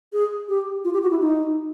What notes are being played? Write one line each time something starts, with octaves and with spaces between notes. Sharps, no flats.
G#4
G4
F4
G4
F#4
E4
D#4